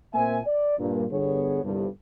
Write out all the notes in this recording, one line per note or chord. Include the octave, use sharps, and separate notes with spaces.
A#2 A#3 C4 E5 G#5
D5
G2 A#2
G1 B3 G#4 C#5
G1 C2 G2